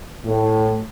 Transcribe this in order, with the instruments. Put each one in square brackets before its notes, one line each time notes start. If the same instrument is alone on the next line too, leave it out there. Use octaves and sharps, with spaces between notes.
[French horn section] A2